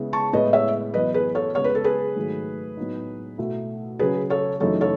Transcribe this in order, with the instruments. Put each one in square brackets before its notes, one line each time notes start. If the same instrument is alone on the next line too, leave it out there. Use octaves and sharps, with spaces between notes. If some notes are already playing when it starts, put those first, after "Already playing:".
Already playing: [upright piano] C#3 G#3 B3 E4
[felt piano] A5 C#6
[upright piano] A2 G#3 B3 E4 [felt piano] B4 D#5
[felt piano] C#5 E5
[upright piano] F#2 E3 B3 [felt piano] B4 D#5
[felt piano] G#4 B4
A4 C#5
[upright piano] C#3 G#3 B3 [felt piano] C#5
[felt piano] B4
A4
G#4 B4
[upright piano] G#2 D#3 F#3 A3
A2 F#3 B3 D#4
B2 A3 E4
[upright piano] C#3 F#3 C#4 [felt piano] G#4 B4
[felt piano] A4 C#5
[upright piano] F#2 C#3 E3 A3 D#4 [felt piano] A4 C#5
[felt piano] A4 C#5